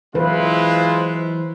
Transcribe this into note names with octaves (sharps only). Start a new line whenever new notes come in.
E3 F#3 G#3 E4 F4 B4 C5